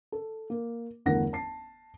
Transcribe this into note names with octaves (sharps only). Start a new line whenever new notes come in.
A4
A#3
G1 E2 A3 A#4 F#5 A#6
A5 C7